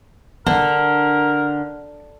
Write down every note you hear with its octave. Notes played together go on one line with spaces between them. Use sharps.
D3 D4 A#4